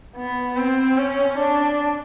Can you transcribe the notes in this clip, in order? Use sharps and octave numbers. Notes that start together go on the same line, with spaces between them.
B3
C4
C#4
D4